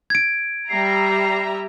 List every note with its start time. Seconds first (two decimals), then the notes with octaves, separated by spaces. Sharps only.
0.10 G#6 D7
0.69 G3 E5 A#5 C7